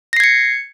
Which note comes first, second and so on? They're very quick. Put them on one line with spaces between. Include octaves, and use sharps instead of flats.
A#6 C7 G#6 C#7